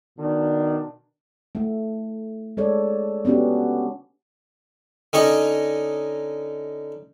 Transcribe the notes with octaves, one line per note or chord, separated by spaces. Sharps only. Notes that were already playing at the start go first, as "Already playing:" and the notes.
B2 D#3 D4
A3
G#3 A4 C#5 D5
B3 C#4 D4 F#4 G4
D3 C#4 D#4 C#5 D#5 C#6